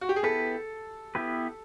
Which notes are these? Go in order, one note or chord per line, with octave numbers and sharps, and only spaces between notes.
F#4
G4
G#4
B3 E4 G4 A4 B4
B3 E4 G4 B4